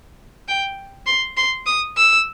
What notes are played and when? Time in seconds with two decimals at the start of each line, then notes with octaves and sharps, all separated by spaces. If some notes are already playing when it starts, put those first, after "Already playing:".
0.48 G5
1.07 C6
1.37 C6
1.67 D#6
1.97 E6